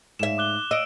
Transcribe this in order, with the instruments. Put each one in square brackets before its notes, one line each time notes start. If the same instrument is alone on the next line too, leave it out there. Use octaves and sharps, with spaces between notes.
[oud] G#2 E5 [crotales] E7
[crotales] D6 F#6 G7
[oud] D#5 [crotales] E6 D7